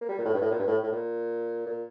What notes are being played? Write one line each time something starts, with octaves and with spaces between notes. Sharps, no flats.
A#3
G3
A#2
A2
G2
A2
A#2
G2
A2
A2
A#2
A#2